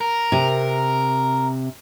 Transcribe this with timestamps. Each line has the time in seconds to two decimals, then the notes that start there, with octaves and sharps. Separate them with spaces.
0.01 A#4
0.32 C3